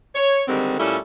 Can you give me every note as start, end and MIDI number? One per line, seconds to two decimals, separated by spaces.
0.15 0.42 73
0.48 0.76 50
0.48 0.76 51
0.48 0.76 55
0.48 0.76 56
0.48 0.76 60
0.79 0.98 46
0.79 0.98 55
0.79 0.98 57
0.79 0.98 61
0.79 0.98 64
0.79 0.98 76